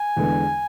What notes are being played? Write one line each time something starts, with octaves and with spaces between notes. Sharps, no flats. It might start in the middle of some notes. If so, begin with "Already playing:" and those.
Already playing: G#5
E2 D3 G#3 B3